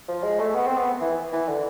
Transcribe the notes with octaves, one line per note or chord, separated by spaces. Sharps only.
F3
G#3
A3
B3
C4
B3
E3
E3
D3